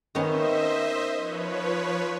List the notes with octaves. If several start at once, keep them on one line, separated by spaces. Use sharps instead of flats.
D#3 B3 C#4 C5 D#5 E5
F3 B4 C#5